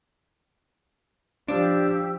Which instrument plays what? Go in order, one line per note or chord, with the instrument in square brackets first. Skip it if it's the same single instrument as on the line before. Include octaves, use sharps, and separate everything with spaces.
[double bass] F3 [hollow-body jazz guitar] D4 [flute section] G4 E6